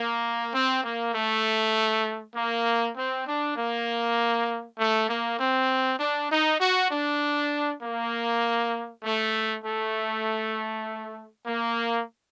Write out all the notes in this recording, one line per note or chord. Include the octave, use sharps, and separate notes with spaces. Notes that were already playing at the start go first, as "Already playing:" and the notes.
Already playing: A#3
C4
A#3
A3
A#3
C4
D4
A#3
A3
A#3
C4
D4
D#4
F#4
D4
A#3
A3
A3
A#3